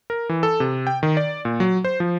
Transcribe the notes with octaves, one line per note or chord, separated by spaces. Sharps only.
A#4
E3
A4
C3
G5
D#3
D5
A#2
F#3
C5
F3